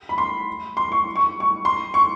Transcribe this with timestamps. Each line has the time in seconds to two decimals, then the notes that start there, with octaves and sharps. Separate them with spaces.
0.09 B5
0.18 C6
0.77 C6
0.92 C#6
1.16 C#6
1.40 C#6
1.65 C6
1.94 C#6